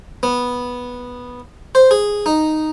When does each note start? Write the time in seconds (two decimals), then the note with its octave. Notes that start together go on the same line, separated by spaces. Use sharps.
0.23 B3
1.75 C5
1.91 G#4
2.26 D#4